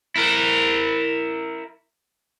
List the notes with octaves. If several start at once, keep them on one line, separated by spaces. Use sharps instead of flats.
E4 A#4